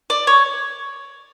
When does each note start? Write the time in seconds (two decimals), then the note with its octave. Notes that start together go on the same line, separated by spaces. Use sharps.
0.10 D5
0.27 C#5